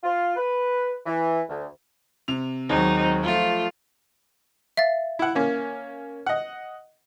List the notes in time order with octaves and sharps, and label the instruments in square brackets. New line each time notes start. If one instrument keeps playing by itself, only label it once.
[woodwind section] F4
B4
E3
D2
[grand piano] C3 F7
[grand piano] D#2 G#3 [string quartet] F#3 C4 D#4
[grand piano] F3 A3 [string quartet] F4
[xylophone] E5 F5 A6
[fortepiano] E4 F#5
A#3 C#4
D#5 F#5